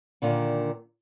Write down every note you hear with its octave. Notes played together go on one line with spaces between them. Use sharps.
A#2 D3 D#3